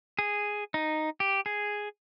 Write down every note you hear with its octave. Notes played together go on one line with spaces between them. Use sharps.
G#4
D#4
G4
G#4